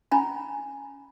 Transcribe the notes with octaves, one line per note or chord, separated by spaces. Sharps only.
C#4 G#5 A#5 B5